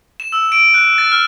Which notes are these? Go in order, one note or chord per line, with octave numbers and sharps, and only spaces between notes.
E7
E6
D7
F#6
A6
F6